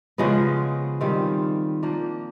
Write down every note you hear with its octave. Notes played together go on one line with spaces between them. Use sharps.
C#3 F3 G#3 B3
D#3 G3 C4 F4
F3 A#3 D4